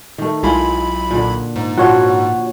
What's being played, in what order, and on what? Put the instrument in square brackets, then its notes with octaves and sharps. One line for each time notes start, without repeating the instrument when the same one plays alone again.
[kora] D#3 A3
[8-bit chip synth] B1 B5 [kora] G#3 E4 F4
[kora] A#2 D3
[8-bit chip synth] G#2
[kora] A#2 F3 F4 [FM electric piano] F#4 C#5 F#5